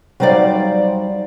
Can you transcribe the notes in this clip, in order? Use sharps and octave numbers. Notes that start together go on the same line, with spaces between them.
F#3 G3 D#4 C5 D5 F5